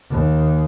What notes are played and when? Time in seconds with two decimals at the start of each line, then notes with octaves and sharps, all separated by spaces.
0.10 D#2